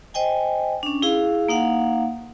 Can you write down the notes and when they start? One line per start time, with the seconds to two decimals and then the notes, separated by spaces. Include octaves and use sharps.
0.14 C5 D#5 G5 G#5
0.83 C#4 D4
1.02 E4 G#4 F5
1.48 A#3 D#4 F5 F#5